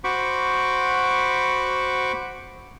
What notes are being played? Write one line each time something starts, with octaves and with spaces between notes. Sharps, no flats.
F#4 C5 B5 C#6 D6